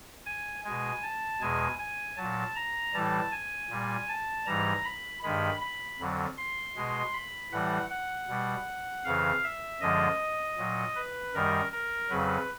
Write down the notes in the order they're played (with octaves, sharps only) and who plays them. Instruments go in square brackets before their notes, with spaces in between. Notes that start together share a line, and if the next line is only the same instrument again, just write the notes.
[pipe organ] G#5
B2 G#3 G#5
A5
E2 B2 G#3 G#5
G#5
A#2 F#3 A5
A#5
A2 E3 G3 A5
G#5
A#2 G3
A5
G#2 E3 G3 A#5
B5
G2 D#3 G#3 B5
B5
F2 D3 F#3
C6
B2 G#3
B5
A2 E3 G3 F#5
F#5
B2 G3
F2 C#3 E3 F5
E5
F#2 D3 F3 G#3 D#5
A#2 F#3
B4
F#2 D#3 G3 A#4
A#4
F2 C#3 F#3 B4